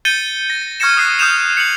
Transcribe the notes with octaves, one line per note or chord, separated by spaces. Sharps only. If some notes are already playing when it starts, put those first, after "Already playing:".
G6 A6 C#7 D#7 G7
A#6
C#6 F6 G#6 A#6 C#7 E7
D#6 F#6 C7
D#6 F6 G6 E7 F7
C#7 F#7